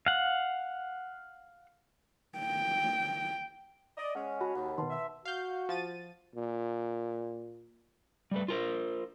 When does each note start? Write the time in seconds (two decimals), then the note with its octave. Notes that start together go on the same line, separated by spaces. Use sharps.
0.06 F5 F#5
2.38 G5
3.98 D5 D#5
4.15 G#3 C#4 F#5
4.41 F#4 A5 B5
4.55 D#2 F#5
4.78 B2 D#3 B4 A5 C6
4.90 E5
5.25 F#4 F5 G6
5.69 F3 A6 D#7
6.35 A#2
8.31 G3 A3 B4
8.48 F4 A#4 C5